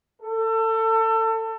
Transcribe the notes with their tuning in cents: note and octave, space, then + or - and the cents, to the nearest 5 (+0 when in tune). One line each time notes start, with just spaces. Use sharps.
A4 +25